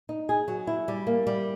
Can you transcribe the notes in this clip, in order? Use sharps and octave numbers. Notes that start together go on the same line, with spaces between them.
D#4
G#4
F#3
E4
G3
A#3
G3